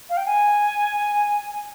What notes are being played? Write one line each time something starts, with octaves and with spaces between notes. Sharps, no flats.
F5
G5
G#5